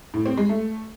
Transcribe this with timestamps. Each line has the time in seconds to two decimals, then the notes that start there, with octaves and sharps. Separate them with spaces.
0.14 A2
0.26 C4
0.37 G#3
0.49 A3